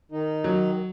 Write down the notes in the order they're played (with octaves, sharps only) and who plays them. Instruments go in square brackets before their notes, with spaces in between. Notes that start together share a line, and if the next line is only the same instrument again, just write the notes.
[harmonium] D#3 D#4
[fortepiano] F#3